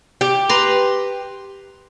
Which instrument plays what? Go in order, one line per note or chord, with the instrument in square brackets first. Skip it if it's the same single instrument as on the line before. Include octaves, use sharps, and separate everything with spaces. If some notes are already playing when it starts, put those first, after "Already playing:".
[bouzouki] G4
[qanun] B4 A#5 C6